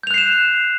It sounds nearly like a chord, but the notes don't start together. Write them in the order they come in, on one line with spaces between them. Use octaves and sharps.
G6 F7 F#6 C7 E7